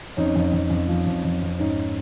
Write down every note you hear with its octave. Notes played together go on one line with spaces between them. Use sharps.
F2 C#4 D#4
F2
F2
F2
F3
F2
F2
F2
G#2 C#4 D#4